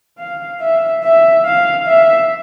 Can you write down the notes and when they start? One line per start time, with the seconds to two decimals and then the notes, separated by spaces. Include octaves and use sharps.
0.18 F5
0.60 E5
1.03 E5
1.45 F5
1.87 E5